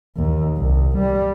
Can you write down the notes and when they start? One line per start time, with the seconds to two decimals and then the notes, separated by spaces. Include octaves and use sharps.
0.17 D#2
0.57 C2
0.98 G3